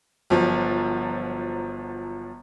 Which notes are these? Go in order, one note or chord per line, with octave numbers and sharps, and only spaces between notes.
G1 F3 F#3